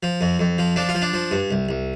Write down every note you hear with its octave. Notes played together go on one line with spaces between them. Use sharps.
F3
F2
F2
F3
F3 D4
F4
F3
D4
F3
G2
C2
C2